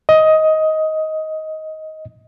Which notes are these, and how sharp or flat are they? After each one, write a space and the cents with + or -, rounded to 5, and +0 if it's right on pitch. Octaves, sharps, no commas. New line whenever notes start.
D#5 +15